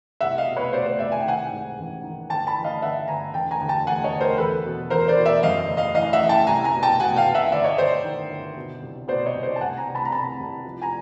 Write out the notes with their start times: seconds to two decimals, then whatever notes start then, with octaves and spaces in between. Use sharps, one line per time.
0.21 C2 E5 F#5
0.38 D#5 F5
0.47 B2
0.56 B4 C#5
0.73 B2 C5 D5
0.86 C5 D5
0.99 C2 D5 E5
1.12 G#5
1.20 G5
1.26 D#3 F#5 G#5
1.52 G#2
1.78 A1
2.03 D#3
2.30 G1 G5 A5
2.47 A5 B5
2.56 E3
2.64 D#5 F5
2.82 G1 E5 F#5
3.08 G1 G#5 A#5
3.34 E1 G5 A5
3.51 G#5 A#5
3.61 D2
3.68 G5 A5
3.86 E1 F#5 G#5
4.04 C#5 D#5
4.12 D2
4.21 A#4 C5
4.38 E2 A4 B4
4.65 B2
4.90 E2 A#4 C5
5.08 C5 D5
5.17 B2
5.25 D5 E5
5.43 F#2 D#5 F5
5.69 F#1
5.77 D#5 F5
5.95 E3 D#5 F5
6.13 E5 F#5
6.21 E3
6.29 G5 A5
6.47 C2 G#5 A#5
6.64 G#5 A#5
6.74 B2
6.83 G5 A5
7.00 B2 F#5 G#5
7.16 F5 G5
7.26 B2
7.34 E5 F#5
7.51 G1 D5 E5
7.64 C#5 D#5
7.78 G1 C5 D5
8.04 D#3
8.29 G1
8.56 B2
8.82 C2
9.08 B2 C5 D5
9.26 C#5 D#5
9.35 C2
9.43 C5 D5
9.56 A5
9.60 C2 F#5 G#5
9.77 G#5 A#5
9.87 C3
9.95 A5 B5
10.05 A#5
10.12 C3 A5 B5
10.39 C2
10.65 F3
10.82 G#5 A#5